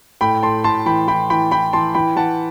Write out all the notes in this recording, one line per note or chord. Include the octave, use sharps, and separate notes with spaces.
A2 G5 B5
A2 A5 C6
A2 A5 C6
E3 G5 B5
E3 G5 B5
E3 G5 B5
E3 G5 B5
E3 A5 C6
E3 G5 B5
E3 F#5 A5